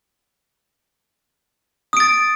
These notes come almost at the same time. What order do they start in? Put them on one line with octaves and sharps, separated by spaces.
D#6 D7 A6